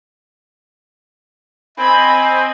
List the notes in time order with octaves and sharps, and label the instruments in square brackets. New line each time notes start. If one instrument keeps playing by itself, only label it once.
[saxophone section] C4 [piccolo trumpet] D#5 [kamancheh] G#5 [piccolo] B5